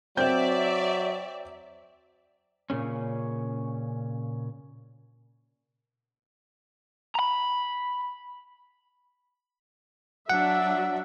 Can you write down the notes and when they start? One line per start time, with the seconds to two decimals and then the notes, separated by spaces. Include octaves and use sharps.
0.17 F#3 C4 D5 E5 G6
2.70 A#2 C#3 C#4
7.15 A#5 B5
10.30 F#3 D4 E5 F#5